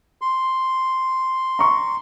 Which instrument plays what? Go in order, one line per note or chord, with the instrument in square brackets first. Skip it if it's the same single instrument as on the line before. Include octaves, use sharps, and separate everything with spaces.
[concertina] C6
[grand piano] A#5 C#6